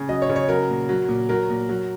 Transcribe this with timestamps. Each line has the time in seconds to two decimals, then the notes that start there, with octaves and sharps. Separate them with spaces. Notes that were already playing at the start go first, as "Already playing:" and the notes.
Already playing: C#3
0.08 F#3 D#5
0.22 C#5
0.29 C#3
0.36 C#5
0.49 F#3 A#4
0.69 A#2
0.89 F#3
1.08 A#2
1.29 F#3 A#4
1.50 A#2
1.69 F#3